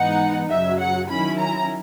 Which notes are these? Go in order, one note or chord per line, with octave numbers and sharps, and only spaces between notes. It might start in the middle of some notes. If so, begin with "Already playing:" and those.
Already playing: G#2 E3 B3 D#4 F#5
F#2 C#3 F#3 E5
F#5
D#3 F#3 C#4 E4 B5
A#5